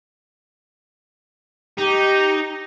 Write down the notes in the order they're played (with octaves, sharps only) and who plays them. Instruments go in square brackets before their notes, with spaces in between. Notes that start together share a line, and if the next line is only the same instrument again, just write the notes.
[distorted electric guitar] D#4 [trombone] G4